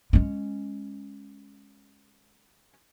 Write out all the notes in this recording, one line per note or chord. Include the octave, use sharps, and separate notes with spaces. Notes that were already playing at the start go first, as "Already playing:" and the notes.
G#3 C#4